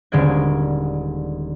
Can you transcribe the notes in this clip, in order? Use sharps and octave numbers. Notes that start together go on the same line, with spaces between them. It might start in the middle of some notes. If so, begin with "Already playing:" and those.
D#1 D3 G#3 D5 D#5 G#6